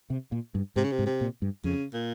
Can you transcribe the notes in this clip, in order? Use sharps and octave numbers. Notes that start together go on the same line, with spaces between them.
C3
A#2
G2
G#2 C3
C#3
C3
G#2
C3
A#2
G2
F2 C#3
A#2